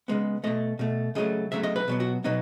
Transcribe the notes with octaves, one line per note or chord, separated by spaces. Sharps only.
C#3 G#3 B3
B2 A3 D#5
B2 A3
C#3 F#3 A3 D#5
C#3 F#3 A3 E5
D#5
B4
B2 F#3 B3
F#4
B2 F#3 B3 D#4